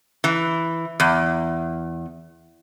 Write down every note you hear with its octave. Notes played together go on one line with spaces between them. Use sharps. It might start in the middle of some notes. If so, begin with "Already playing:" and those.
E3
E2